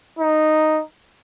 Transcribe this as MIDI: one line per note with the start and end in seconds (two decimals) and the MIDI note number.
0.19 0.82 63